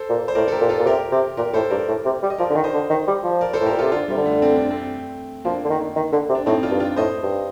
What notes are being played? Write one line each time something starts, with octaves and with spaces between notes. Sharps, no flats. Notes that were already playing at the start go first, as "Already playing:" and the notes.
Already playing: A4 C5
A#2
C5
A2 A#4 D5
A4
G4 A#4
A#2
F4 A4
A#2
C3 G4 A#4
C3
A#2 G4 A#4
A2 A4 C5
G2 A#4 D5
A2
C3
G3
D#5
F3 A#4 D5
D3
D#3
C5 D#5
D3
D#3
G3
F3
A#4 D5
A4 C5
A2
G4 A#4
A#2
C3 F4 A4
D3 D4 F4
C3 G3
D3
A3
C4
D4
A3 C4
F3 A#3 D4
D3
D#3
D#3
D3
C3
D4
A2 C4 D#4
D4 F4
G2
D4 F4
A2 C5 D#5
G2